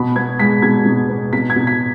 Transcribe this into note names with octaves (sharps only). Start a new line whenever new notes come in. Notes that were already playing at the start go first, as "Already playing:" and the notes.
Already playing: B2 B5
B3 G#6
G#3 B6
B2 G#6
B2
B3
B2 B6
G#6
B2
B6